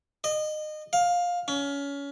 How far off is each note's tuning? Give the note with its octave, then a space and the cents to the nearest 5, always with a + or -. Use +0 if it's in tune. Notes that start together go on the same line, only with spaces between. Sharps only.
D#5 -25
F5 +15
C#4 +25